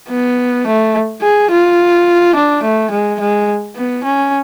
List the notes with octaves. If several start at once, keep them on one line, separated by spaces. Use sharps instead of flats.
B3
A3
G#4
F4
D4
A3
G#3
G#3
B3
C#4